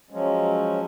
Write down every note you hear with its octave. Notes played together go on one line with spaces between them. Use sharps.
F3 F#3 G#3 C#4